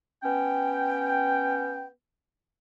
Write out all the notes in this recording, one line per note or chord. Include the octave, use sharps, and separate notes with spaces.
B3 C#4 G5